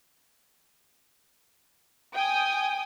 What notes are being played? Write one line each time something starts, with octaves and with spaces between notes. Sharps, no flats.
G5 G#5 D#6